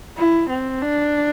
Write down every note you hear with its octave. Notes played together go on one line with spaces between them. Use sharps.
E4
C4
D4